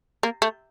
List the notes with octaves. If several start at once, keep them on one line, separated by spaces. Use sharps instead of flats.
A#3
A3